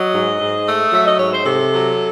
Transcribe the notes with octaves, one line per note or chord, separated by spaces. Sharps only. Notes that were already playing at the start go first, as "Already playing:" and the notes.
Already playing: F#3 D#5
G#2
G#2
A3
F#3 E5
D#5
G#2 C#5
C5
C3 A4
F#3